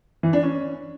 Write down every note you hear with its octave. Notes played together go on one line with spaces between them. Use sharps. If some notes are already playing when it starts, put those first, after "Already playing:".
E3
D4
C#4